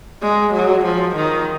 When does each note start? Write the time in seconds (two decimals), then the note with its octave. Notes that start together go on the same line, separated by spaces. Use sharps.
0.23 G#3
0.53 F#3
0.84 F3
1.16 D#3